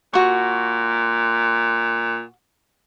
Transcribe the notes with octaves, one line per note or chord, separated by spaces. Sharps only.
A#2 F#4 C#6